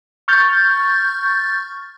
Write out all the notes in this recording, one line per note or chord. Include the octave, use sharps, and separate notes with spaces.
C#6 F6 G6 A6